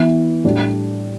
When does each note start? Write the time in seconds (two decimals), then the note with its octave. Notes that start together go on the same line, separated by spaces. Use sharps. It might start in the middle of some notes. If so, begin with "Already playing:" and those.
Already playing: E3 B3 E4
0.44 A2 G3 D4 G4